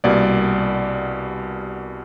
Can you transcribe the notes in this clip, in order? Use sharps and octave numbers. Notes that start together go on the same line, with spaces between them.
C2 B2 G3 A#3 D5